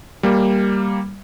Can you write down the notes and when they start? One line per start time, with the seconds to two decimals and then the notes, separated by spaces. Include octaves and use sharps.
0.23 G3 A#3